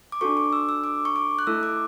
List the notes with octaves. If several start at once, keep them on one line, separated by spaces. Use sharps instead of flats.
D6
D4 F#4 A4 C#6
D6
E6
E6
D6
C#6
D6
F#6
A3 E4 A4 E6
D6